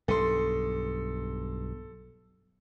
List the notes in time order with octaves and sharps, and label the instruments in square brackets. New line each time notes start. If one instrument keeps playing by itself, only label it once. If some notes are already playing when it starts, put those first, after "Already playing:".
[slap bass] B1 G2 [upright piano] A4 C6